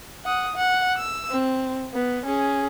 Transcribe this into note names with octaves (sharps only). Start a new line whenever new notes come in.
F#5 D#6
F#5
E6
C4
B3
C#4 G#4